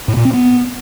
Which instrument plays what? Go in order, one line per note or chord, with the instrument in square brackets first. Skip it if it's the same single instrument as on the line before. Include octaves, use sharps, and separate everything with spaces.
[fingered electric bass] A2
A#2
C4
B3